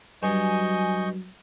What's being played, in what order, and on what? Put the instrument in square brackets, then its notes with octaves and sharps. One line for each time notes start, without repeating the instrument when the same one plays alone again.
[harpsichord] G2 [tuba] F#3 [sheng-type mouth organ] D#5 C#6 G6 [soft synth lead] G#5